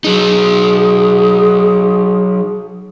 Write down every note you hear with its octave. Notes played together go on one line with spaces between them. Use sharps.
F#3 D#4 G#4